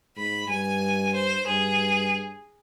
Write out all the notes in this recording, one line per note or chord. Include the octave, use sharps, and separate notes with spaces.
G#2 B5
G2 G#5
C5
G2 G#4